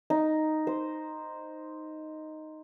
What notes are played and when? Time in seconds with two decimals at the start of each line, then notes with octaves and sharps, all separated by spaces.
0.10 D#4
0.67 C5